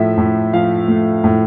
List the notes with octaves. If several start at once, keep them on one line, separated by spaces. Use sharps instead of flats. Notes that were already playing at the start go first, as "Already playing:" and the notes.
Already playing: A2 F3 A3 E5
A2
F3 F5
A3
A2